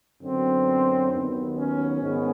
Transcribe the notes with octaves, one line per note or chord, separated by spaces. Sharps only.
F#2 D3 F#3 B3 C4
D#2 D#3 F#3 B3
C#4
G#2 D#3 G#3 B3